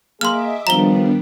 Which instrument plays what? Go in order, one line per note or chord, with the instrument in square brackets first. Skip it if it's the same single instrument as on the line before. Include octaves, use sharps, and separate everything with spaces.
[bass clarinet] A#3 [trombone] G#4 [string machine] D#5 E5 D6 [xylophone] C6 F6
[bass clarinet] D#3 [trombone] F3 [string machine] G3 B3 D4 [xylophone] A#5 G7